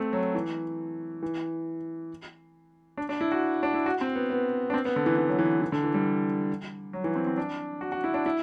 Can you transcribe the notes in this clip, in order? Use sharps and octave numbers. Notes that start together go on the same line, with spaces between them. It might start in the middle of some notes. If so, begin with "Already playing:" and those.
Already playing: A3 C4
F#3
E3
E3
D4
D4
E4
F#4
D4
E4
F#4
C4
B3
B3
D4
C4
B3
D3
E3
E3
F#3
E3
E3
D3
E3
G3
F#3
E3
C4
C4
D4
F#4
F#4
E4
D4
E4